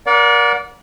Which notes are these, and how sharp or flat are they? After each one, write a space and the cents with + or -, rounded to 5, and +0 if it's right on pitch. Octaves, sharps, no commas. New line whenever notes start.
A#4 +25 D5 -20 F#5 -35